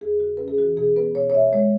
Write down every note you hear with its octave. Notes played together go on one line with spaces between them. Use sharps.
E2 G#4
C#3 F#4
C#4 B4
G#4
E3 F#4
B2 G#4
B3 B4
B2 C#5
C#5
B2 E5
G#3 C#5